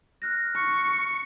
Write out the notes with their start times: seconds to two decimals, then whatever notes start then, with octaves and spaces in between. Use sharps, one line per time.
0.22 F6 F#6 A#6
0.56 C#6